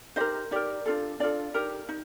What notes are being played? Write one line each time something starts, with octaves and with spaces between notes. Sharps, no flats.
D#4 G4 A#4 C5 D#5
D#4 G4 A#4 D5
D4 F4 A4
D4 F4 A4 D5
D#4 G4 A#4
D#4